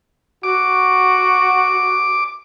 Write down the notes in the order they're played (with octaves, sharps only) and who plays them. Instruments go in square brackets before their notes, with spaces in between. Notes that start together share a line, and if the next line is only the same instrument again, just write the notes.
[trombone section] F#4 [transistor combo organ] D6